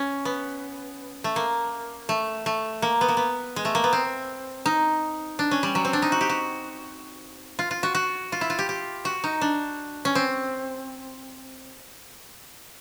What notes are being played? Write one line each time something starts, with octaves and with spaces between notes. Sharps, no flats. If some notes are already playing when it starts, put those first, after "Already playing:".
Already playing: C#4
B3
A3
A#3
A3
A3
A#3
B3
A#3
B3
G#3
A3
A#3
B3
C4
D#4
D4
C#4
G3
F#3
C4
D4
D#4
F#4
G4
F#4
F4
F4
F#4
F#4
F4
E4
F4
G4
G4
F#4
D#4
D4
C#4
C4